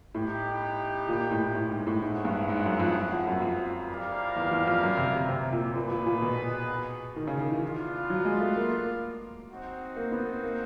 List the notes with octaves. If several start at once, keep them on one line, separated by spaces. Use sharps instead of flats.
A2 B3 D#4 G4
A#2
A2
A2
G#2
A2
G#2 E4 G#4 C#5 F#5
G2
G#2
F#2
F2
F2
F2
F#2
F2
E4 G4 A#4 D5 F5
E2
E2
F2
F#2
C3
C3
C3
A#2
A#2 B3 D#4 G#4 B4
A#2
A#2
B2
D#3
C#3
D#3
E3
B3 D4 F4
F#3
G#3
A3
A#3
C4 D#4 F#4
A#3
B3
A#3